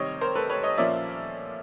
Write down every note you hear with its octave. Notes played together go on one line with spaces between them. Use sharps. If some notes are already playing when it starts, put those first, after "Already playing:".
Already playing: C3 D#3 G3 C4 C#5 D#5
A#4 C5
A4 B4
B4 C#5
C#5 D#5
A#2 F3 A#3 C#4 D5 E5